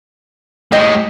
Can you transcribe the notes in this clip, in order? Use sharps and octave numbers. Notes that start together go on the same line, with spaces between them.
A2 G#3 G4 D#5